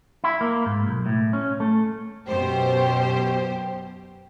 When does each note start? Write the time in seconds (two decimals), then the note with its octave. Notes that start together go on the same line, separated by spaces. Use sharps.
0.24 E4
0.41 A#3
0.66 G#2
0.88 B1
1.06 A2
1.33 C#4
1.60 A3
2.28 F#2 B2 G4 C5